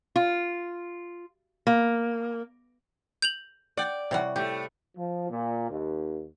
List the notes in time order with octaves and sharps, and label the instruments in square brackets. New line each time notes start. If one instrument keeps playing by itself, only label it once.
[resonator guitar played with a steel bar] F4
A#3
[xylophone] G6 F7 F#7
[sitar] D5 [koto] F#5 G5
[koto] C3 G3 [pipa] E4 C#5 F#5
[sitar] A2 A3 [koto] G4
[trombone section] F3
A#2
D#2